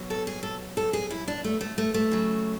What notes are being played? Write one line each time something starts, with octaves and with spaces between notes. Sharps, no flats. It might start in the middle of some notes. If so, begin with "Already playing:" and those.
Already playing: B2 F#3
A4
G#4
A4
A4
G#4
E4
D4
A3
A3
A3
A3
C#3 F#3